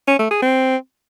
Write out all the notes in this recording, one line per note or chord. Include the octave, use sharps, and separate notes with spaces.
C#4
A3
G#4
C4